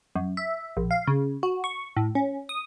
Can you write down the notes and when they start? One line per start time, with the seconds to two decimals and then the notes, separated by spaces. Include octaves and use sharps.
0.15 F#2
0.37 E5
0.77 A#1
0.91 F5
1.07 C#3
1.43 F#4
1.64 C#6
1.96 A2
2.15 C#4
2.49 D#6